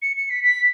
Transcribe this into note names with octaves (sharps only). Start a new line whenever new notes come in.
C#7
C#7
B6
B6